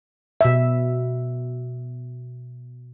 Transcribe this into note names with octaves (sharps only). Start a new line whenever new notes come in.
B2 E5